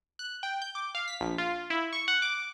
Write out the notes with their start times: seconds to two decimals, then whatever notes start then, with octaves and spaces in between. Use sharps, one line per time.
0.19 F#6
0.43 G5
0.62 G6
0.75 D6
0.95 F5
1.08 B6
1.21 A#1
1.38 F4
1.70 E4
1.93 C#6
2.08 F#5
2.22 D6